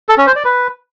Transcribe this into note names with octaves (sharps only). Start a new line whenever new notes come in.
A4
C#4
C5
D5
B4